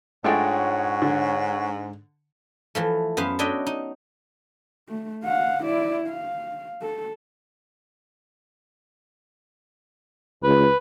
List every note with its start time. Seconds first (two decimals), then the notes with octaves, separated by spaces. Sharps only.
0.24 G#2 G#3 A3 D4 F4 C#5 F#5 G5
1.02 D3
2.75 E3 F3 A3
3.17 F#2 B3 C5 F5
3.39 D4 F#4 C#5 D#5 E5 G5
3.66 D#4
4.89 A3
5.24 F5 F#5
5.64 E4 D5
6.08 F5
6.82 A4
10.44 C#2 B4